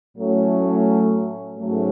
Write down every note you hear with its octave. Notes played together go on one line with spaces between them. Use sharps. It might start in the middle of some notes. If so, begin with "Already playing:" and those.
A2 F#3 A3 C#4
G#2 F#3 A3 C#4